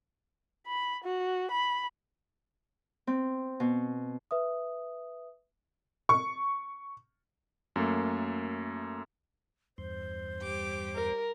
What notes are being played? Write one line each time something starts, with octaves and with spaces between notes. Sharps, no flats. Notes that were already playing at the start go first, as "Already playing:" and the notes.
B5
F#4
B5
C4
B2
B4 E5 D#6
C#6
F#2 A3 A#3 A4
E2 G2 C5 C6
G3 G4 D6
A#4